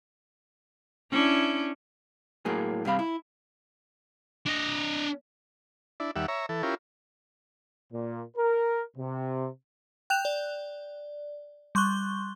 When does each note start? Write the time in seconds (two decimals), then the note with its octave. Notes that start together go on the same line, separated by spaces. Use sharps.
1.11 C#4 D4 E4
2.45 A2 F#3 A#3 G#4
2.85 G2 C3 F5 B5
2.99 E4
4.46 D4 D#5
6.00 D4 E4
6.16 D#2 G3 E5 F#5
6.28 C#5 E5 A#5
6.49 E3 A4
6.63 C#4 E4 F4 G4 A#4
7.93 A#2
8.36 A#4
8.97 C3
10.10 G5 F#6 G6 E7 F7
10.25 D5
11.75 G3 C6 C#6 F#6 G7